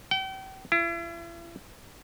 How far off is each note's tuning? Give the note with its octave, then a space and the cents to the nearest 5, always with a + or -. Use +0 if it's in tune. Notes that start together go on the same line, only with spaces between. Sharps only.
G5 -40
E4 +40